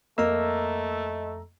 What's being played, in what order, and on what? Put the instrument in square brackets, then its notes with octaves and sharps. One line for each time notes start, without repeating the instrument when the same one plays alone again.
[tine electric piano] F2 A#5 E6 [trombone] A3 [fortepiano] A#3 [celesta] D#5